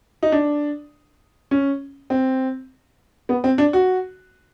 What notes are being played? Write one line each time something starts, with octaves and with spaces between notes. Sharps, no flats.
D#4
D4
C#4
C4
B3
C4
D4
F#4